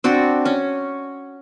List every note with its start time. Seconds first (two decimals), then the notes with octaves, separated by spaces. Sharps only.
0.04 C4 D4 F#4
0.45 C#4